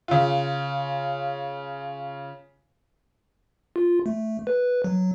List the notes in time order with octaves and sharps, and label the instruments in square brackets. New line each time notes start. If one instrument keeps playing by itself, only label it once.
[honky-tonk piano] C#3 F4
[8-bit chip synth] F4
A3
B4
F#3